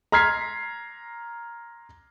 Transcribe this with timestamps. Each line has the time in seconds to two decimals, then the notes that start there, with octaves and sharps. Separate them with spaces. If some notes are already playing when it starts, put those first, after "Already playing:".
0.12 A#5 C6 F6 G#6 B6 C7